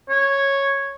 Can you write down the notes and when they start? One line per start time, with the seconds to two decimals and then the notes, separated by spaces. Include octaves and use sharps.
0.09 C#5